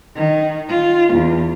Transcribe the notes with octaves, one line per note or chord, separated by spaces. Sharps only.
D#3
F4
E2